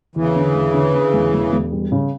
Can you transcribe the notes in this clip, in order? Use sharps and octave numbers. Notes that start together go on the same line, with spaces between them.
E2 C#3 E3
D3
E1
D3
D3
E1
E1
E1
G3
C#3